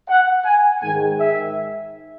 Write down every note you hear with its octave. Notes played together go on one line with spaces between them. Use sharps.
F#5
G#5
G#2 D#3 G#3 G#5
E5